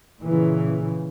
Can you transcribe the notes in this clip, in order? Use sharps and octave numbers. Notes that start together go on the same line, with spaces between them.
A#2 C#3 E3